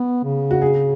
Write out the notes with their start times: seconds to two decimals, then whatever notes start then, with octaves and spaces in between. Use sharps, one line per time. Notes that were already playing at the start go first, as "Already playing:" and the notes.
Already playing: B3
0.24 C#3
0.51 F#4
0.62 G#4